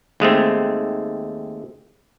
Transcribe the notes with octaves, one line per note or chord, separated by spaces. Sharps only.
D#2 G#3 A3 C4